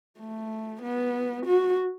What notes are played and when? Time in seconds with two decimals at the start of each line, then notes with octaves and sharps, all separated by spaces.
0.19 A3
0.82 B3
1.46 F#4